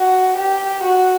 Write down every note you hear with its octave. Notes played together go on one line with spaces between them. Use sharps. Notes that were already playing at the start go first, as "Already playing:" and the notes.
Already playing: F#4
G4
F#4